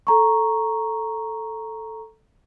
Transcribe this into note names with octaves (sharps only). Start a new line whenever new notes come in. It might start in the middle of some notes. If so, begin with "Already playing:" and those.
A4 A#5 C#6